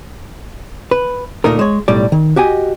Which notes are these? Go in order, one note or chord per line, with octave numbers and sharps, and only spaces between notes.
B4
D2 A#2 A3 D#4 A#4
G#3 C#5
B1 A2 G3 D5
D#3
F#4 G4 D#5 G#5